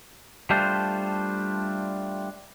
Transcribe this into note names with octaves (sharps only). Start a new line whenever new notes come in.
G3 A3 D4 F4 C5